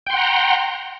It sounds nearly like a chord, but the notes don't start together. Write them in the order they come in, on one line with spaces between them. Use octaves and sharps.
G5 C6 F#5 A#5